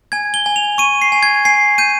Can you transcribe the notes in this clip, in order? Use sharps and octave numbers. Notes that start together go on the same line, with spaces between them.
G#5 G#6
G7
G#5
F7
C#6 D#7
C7
G#5
G#6
G#5 C7
G6 D#7